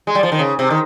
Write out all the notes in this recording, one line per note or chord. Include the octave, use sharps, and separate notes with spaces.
G#3
G3
F3
D#3
C#3
C3
D#3